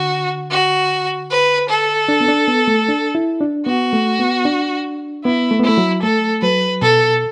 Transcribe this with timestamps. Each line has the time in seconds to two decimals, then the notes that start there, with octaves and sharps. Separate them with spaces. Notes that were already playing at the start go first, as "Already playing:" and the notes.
Already playing: D3 F#4
0.51 F#4
1.30 B4
1.70 A4
2.09 D4
2.21 B3
2.28 D4
2.48 B3
2.68 A3
2.88 D4
3.15 E4
3.41 D4
3.66 B3 F#4
3.93 A3
4.20 B3
4.45 D4
5.24 B3 E4
5.51 A3
5.60 B3
5.64 A3 E4
5.78 F#3
6.03 A3 A4
6.42 F#3 B4
6.82 B2 A4